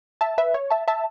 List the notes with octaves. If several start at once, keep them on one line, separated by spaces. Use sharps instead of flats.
E5 A5
B4 E5
C#5
E5 A5
E5 A5